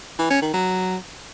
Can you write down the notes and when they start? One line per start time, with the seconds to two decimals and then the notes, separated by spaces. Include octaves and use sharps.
0.19 E3
0.30 C#4
0.42 D#3
0.54 F#3